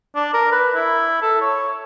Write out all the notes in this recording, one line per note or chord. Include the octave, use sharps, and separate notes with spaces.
D4
A#4
B4
E4
A4
C#5